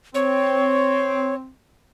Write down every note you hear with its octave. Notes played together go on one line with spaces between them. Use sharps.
C4 C#5